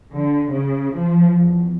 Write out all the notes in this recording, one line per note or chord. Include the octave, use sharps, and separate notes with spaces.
D3
C#3
F3
E2